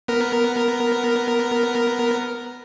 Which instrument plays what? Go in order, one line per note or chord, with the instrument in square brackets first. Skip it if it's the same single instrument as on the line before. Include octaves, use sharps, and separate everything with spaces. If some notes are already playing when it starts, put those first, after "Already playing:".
[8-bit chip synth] B3 A#4